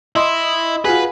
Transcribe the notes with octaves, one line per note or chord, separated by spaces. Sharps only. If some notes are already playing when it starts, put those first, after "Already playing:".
E4 D#5 C6
F4 F#4 G#4 B4